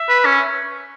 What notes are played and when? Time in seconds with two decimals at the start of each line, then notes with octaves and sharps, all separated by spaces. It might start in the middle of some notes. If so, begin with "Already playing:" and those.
Already playing: E5
0.09 B4
0.26 C#4